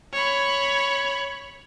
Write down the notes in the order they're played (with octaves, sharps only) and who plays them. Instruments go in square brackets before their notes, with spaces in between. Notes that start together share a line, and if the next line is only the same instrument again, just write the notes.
[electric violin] C#5 B5